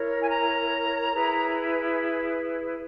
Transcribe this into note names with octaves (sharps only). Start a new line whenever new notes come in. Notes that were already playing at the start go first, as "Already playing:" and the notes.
Already playing: E4 A#4 C#5
G#5
A#5
E4 G#4 B4